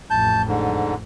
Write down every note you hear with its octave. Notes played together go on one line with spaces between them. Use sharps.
A1 F2 A5 G6
G#2 D3